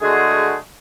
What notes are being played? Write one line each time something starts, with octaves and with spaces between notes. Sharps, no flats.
D3 G#3 A3 F#4 G#4